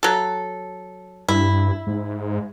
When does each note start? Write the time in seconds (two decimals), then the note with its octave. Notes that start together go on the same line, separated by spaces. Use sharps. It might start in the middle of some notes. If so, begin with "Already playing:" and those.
0.03 F#3 A4
1.28 G2 E4
1.87 G#2